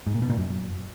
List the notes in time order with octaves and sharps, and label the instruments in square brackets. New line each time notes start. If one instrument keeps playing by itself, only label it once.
[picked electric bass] G#2
A#2
B2
A#2
F#2